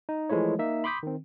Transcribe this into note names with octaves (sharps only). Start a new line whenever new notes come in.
D#4
E3 F3 G#3 A3 E4 C#5
A#3 D#4 E5
B5 C6 D6 D#6 G6 B6
D#3 C4